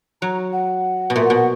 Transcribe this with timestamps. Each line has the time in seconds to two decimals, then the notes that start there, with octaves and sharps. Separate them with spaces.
0.22 F#3 A#5
0.52 F#5
1.10 B2
1.16 A#2 E5
1.25 F#5
1.30 B2
1.35 F#5